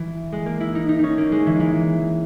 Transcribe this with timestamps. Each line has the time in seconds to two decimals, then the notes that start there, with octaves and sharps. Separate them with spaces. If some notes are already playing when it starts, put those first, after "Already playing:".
Already playing: E3
0.32 G#3
0.46 A#3
0.60 E4
0.75 D#4
0.89 D#4
0.99 C#4 D#4
1.18 A#3
1.32 G#3
1.46 E3
1.60 E3